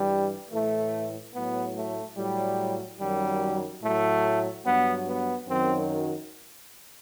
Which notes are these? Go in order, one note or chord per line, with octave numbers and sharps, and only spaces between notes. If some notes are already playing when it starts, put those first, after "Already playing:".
Already playing: G2 E3 G3
A2 E3 A3
A2 F#3 B3
A3
A2 F#3 G3
F#2 D#3 F#3 G3
A2 F#3 A3
G2 F#3 B3
B3
F#2 D#3 F#3 C4